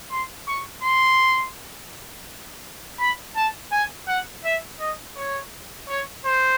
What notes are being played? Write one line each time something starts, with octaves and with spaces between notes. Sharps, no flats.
C6
C#6
C6
B5
A5
G#5
F#5
E5
D#5
C#5
C#5
C5